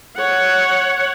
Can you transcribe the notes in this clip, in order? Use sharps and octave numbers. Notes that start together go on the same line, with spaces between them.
C#5 F#5